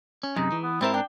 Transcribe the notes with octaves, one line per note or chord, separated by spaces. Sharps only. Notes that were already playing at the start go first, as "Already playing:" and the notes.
C#4
F#2 C3 G#3 D#4
E3
B3
G#2 G3 C4 E4 A#4 C5 E5
D4 G5